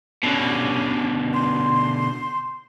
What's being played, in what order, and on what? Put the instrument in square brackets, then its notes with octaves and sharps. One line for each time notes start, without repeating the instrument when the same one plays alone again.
[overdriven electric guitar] B2 D3 [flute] C#4
[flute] C6